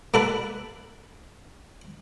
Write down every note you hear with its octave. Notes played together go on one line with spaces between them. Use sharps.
A#3 A4 B4